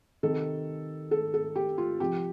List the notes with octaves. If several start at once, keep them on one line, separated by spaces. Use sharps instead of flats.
C3 D#3 A4
A4
A4
G4
F4
C3 F3 G4